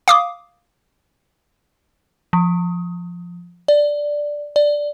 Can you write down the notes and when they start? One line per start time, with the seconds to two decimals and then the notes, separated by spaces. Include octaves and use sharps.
0.08 F5 D6 D#6
2.33 F3
3.68 D5
4.56 D5